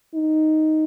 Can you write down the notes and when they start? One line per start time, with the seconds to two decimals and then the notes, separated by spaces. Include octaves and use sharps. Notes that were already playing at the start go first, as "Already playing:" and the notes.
0.15 D#4